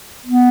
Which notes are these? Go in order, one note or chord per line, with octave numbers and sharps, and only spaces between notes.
B3